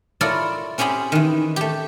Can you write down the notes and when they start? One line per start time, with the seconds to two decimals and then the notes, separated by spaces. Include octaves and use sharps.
0.21 E4 F4 A4 A#4 C#5 D5
0.78 C4 C#4 G4 G#4 B5
1.12 D#3 E3
1.56 A3 G4